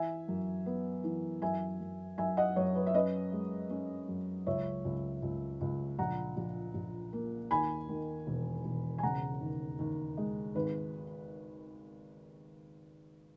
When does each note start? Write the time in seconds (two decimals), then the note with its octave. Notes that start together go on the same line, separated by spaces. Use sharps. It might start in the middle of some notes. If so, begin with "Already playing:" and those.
Already playing: E3 E5 G#5
0.28 F#2
0.66 B3
1.04 E3
1.42 F#2 E5 G#5
1.80 F#2
2.18 F#2 E5 G#5
2.37 D#5 F#5
2.56 F#2 C#5
2.75 B4
2.86 E5
2.94 C#4 B4 D#5
3.32 G#3
3.70 C#4
4.08 F#2
4.47 C#2 C#5 E5
4.85 C#2
5.23 C#2
5.61 C#2
5.99 A#1 F#5 A#5
6.37 A#1
6.74 A#1
7.13 A#3
7.51 D#2 G#5 B5
7.89 D#3
8.27 E1
8.65 E1
8.98 G#5
9.03 C#3 F#5 A#5
9.41 D#2
9.79 D#2
10.17 G#3
10.55 G#1 B4